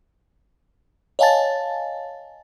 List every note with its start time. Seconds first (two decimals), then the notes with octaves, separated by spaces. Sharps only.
1.19 C#5 D#5 F5 G#5 A5 A6